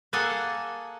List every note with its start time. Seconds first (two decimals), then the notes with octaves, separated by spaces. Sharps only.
0.13 A#3 G#4 A4 F#5 G#5 A5